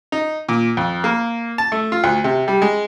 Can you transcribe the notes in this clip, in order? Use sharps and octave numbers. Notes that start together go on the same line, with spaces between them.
D#4
A#2
F2
A#3
A5
A3
F4
D2
C3
G3
G#3